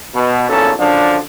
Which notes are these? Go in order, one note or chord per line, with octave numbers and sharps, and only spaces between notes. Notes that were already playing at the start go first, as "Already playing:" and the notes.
B2
B1 E2 A#2 C#4 A4
F#2 D3 F3 D4